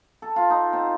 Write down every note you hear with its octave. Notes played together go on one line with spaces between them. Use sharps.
A4
F4
D#4
C4